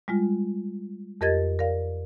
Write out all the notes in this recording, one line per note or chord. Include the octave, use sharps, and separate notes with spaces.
G3 G#3 F4
F2 G4 A#4 D#5 G#6 A6
A#4 D5 F5